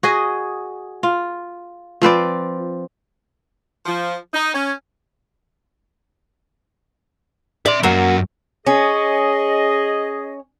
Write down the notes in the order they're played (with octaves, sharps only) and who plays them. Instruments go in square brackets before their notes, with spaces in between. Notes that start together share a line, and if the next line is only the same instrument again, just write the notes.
[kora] F#4 G#4 D#5
F4
F3 C4 B4 D5
[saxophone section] F3
D#4
C#4
[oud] D5 [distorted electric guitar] E5 C6
[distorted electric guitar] F#2 F#4 [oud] F#3 A#3
[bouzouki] C#4 [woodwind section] G#4 D#5